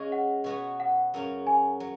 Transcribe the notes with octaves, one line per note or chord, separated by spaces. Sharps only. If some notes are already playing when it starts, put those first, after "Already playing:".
Already playing: C#3 G#3 C#4 G#4 D#5
F#5
B2 B3 F#4 C#5
F#5
F#2 C#3 F#3 C#4
G#5
F#3